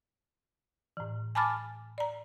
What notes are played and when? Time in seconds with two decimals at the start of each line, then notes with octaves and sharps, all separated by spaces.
0.97 A2 E3
1.35 G#5 A5 B5 D6 F6 A6
1.98 D5 A#5